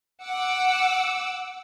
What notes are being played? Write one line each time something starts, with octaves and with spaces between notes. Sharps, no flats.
F#5 D6 E6